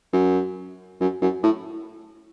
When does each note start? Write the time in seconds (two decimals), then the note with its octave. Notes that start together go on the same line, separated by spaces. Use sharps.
0.13 F#2
1.01 F#2
1.22 F#2
1.43 A2